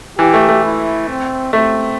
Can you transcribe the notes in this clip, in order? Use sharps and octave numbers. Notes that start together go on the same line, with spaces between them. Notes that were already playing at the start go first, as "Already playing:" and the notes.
E3 G4
A3
A3
E4
C4
A3 C4